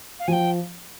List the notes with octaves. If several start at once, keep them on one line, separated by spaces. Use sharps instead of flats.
F5
F3 G5 G#5